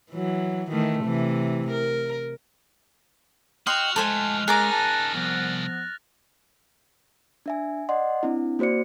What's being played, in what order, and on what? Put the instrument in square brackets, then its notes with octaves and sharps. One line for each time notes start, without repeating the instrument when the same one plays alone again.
[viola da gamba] E3 F#3
D#3 E3 A3
C3 E3
A#4
[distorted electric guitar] F#4 [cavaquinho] D#5 G5 C6 [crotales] F6 F#6 F7
[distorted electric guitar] F3 A3 [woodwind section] G#3 [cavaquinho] A4 C5 G#5
[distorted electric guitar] C#4 D#4 [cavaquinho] G#4 A#4 D6 [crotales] F#6 A6 A#6
[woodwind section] A5
[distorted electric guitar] C2 [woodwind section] F3 B3
[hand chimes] D4 E5 G#5
D5 D#5 F#5 C6
C4 D4 E4
A#3 F#4 C5 D5 C#7